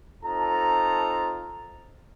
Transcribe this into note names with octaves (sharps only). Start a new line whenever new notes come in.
C4 D#4 F4 A4 A5 A#5